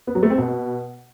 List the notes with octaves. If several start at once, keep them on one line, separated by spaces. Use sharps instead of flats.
B3
F#3
A3
C4
B2